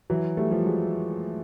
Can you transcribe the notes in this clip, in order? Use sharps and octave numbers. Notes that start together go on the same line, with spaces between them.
E3 F#3
G3 A3
F3 G3
F#3 G#3